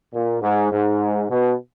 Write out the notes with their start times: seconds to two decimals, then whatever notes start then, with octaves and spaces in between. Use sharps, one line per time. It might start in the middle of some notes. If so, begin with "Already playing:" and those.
0.13 A#2
0.41 G#2
0.70 G#2
1.28 B2